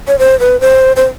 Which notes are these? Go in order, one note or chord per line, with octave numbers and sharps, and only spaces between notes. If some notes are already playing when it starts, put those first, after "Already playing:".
C#5
C5
B4
C5
C5